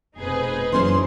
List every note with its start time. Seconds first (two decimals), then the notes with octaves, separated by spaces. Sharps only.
0.18 F1 B2 C4 D#4 G#4 B4
0.72 F#2 E3 C#4 C5 C6